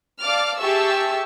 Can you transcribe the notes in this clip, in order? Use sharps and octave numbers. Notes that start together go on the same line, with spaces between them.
D5 F5 A5 D6 F6
G4 G#4 E5 A5 C#6 E6